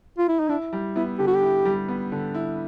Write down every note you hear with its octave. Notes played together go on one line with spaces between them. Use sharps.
F4
E4
D#4
D4 E4
G3
B3 E4
D3 G4
F#4
G4
E4
G3
B3
D3
E4